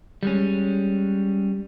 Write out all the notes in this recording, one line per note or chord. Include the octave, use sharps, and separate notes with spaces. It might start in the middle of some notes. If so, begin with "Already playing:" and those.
G3 G#3 C#4